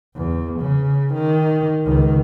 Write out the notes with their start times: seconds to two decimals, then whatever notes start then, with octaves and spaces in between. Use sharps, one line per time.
0.15 E2
0.60 C#3
1.14 D#3
1.86 C#2 D#3